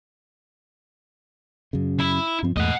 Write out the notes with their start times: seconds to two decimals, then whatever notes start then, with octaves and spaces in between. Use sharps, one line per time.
1.73 F#2 C#3
1.99 E4
2.43 G2 F3 C4
2.57 E2 G#2 A3 D#5 F#5